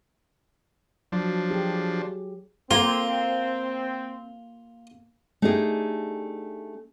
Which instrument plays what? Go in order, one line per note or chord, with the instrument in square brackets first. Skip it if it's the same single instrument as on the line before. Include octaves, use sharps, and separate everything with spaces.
[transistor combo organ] F3 D4 [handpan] F#3
[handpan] G4 G#4
[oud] A#3 [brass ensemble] C4 [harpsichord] F4
[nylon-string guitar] A3 D4 D#4 G4 G#4